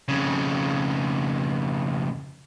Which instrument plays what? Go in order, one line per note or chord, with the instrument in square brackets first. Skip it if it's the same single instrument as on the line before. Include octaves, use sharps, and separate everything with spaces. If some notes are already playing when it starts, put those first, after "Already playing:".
[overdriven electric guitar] F2 C#3